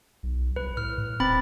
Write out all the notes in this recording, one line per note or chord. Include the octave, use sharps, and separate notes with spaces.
B1
C2 B4
A2 F6
A2
D#1 C4 B5 A6